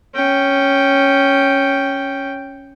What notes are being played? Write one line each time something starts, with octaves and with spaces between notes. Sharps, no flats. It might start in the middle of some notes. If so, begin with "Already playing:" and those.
C#4 G5